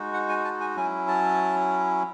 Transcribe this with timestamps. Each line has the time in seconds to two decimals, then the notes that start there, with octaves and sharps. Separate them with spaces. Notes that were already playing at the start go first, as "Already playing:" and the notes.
Already playing: G#3 D#4 F#4
0.14 F#5
0.29 G#5
0.45 A5
0.60 G#5
0.76 F#3 C#4 E4 G#5
1.08 A5